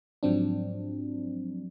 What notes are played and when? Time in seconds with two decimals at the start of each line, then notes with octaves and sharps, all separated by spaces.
0.23 G#2 F3 F#3 C4 D4